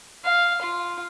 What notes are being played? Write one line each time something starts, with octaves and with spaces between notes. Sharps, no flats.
F5
F4